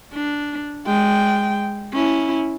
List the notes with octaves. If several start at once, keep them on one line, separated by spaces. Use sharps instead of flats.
D4
G#3 G5
C#4 E4